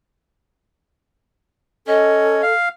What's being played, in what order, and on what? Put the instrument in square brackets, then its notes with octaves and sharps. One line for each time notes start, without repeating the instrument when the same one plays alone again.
[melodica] C#4 [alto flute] A4 [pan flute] D#5
[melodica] F5